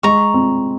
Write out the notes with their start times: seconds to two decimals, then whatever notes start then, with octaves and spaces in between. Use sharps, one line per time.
0.03 G#3 A#5 C#6
0.34 C4